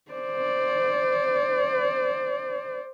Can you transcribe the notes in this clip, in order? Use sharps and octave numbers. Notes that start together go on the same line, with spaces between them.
C5 D5